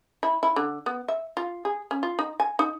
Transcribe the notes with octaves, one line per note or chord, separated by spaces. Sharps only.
E4
E4
D3
B3
E5
F4
G#4
C#4
F4
D#4
G#5
D#4